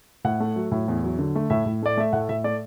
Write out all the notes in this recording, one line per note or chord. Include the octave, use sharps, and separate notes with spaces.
A2 F#5
A3
F#3
A2
E2
F#3
D3
A3
A2 E5
A2
A3 D5
A3 E5
A2 F#5
A2 E5
A3 D5